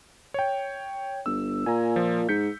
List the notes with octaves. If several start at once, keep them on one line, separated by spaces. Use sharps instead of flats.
C#5 G5
G1 E6
A#2 G#5 A#5
F3
G#2 G6 B6 C#7